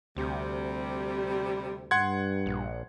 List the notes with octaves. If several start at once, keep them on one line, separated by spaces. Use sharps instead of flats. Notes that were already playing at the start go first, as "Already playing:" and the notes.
D2 C3 G3
G2 F#5 C6 G#6
A#1